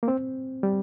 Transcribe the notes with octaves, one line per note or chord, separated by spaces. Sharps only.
A#3
C4
G3